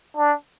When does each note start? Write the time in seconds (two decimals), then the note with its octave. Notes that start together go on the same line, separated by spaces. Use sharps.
0.17 D4